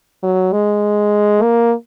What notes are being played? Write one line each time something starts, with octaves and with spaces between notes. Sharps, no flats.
F#3
G#3
A#3